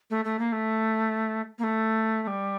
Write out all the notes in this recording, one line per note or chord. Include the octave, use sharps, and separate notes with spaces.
A3
A3
A#3
A3
A#3
A3
A3
G3